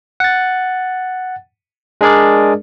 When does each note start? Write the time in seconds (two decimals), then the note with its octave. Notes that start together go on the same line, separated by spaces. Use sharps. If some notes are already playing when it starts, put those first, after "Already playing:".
0.20 F#5 A6
2.01 G#3 D4 G#4 A#4 D5